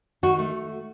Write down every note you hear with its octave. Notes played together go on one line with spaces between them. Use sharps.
D#3 F#4
A3